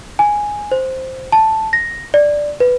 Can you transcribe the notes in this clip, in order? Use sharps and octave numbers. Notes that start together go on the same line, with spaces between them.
G#5
C5
A5
A#6
D5
B4